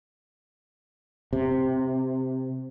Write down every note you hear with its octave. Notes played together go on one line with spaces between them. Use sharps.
C3